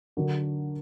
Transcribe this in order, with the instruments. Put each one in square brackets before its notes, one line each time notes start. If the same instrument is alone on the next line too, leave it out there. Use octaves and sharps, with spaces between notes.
[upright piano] D3 F#3 D4 F#4 A#4